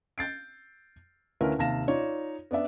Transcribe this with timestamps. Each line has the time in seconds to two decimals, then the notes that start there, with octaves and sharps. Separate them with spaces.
0.18 G6 A6 C7 D7
1.41 D2 C#4 E4 A#4 B4 F5
1.59 D#2 C3 F5 A5 A#6 E7
1.88 D#4 F4 C#5 D5
2.51 B3 D4 D5 E5